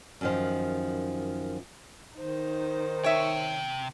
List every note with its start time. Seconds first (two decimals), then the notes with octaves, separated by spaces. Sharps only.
0.21 F#2 D#3 F3
2.17 D#3 D#4 C5
3.04 C3 C#5 E5 G5